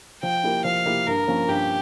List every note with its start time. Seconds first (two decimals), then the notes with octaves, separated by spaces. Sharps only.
0.23 F3 G5
0.43 A#3 E4 G4 A#4
0.64 F3 F5
0.86 A#3 E4 G4 A#4
1.07 G2 A#4
1.27 F3 A#3 C#4
1.48 G2 G4